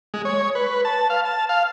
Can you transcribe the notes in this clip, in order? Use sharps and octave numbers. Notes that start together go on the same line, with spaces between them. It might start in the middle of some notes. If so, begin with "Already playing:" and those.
G#3
C#5
B4
A5
F5
A5
F5